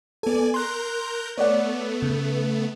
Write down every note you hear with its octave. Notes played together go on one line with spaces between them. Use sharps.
B3 A4 D5 G#5
A#4 A#5 C6 F#6 G6
A3 B3 C#5 D5 F#5
C#3